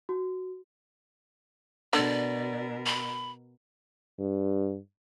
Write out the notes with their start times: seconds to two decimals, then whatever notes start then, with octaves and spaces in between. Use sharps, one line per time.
0.09 F#4
1.93 B2 D3 A#4 D5
2.86 B5
4.19 G2